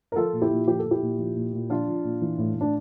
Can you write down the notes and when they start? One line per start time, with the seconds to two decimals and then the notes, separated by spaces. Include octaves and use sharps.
0.12 A#4
0.16 F3 F4 A4
0.33 A#2
0.42 E4 G4
0.50 A#2
0.67 F3 G4
0.79 A4
0.84 F3
0.91 E4 G4
1.02 A#2
1.19 F3
1.36 A#2
1.53 A#2
1.70 F3 D4 F4
1.87 F3
2.04 A#2
2.21 E3
2.38 A2
2.55 A2
2.61 D4